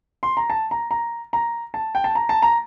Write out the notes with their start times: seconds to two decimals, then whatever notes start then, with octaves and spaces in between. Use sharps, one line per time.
0.23 C6
0.37 A#5
0.50 A5
0.71 A#5
0.91 A#5
1.33 A#5
1.74 A5
1.95 G5
2.04 A5
2.15 A#5
2.29 A5
2.42 A#5